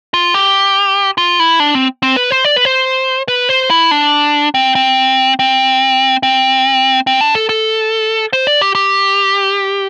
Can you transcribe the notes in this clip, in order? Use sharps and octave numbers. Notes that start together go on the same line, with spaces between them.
F4
G4
F4
E4
D4
C4
C4
B4
C5
D5
B4
C5
B4
C5
E4
D4
C4
C4
C4
C4
C4
D4
A4
A4
C5
D5
G4
G4